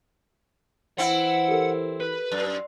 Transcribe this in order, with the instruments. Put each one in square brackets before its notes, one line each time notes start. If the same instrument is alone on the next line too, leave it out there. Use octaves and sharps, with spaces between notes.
[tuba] E3 [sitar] C4 E4 [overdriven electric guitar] F#5
[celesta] G4 A4 A#4
[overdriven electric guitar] B4
[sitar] F#2